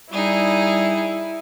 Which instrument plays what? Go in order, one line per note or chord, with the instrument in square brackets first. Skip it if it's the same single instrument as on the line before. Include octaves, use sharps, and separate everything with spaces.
[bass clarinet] G3 [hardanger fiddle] D#4 G#4 [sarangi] E4